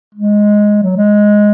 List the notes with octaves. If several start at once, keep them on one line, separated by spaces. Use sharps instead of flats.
G#3
F#3
G#3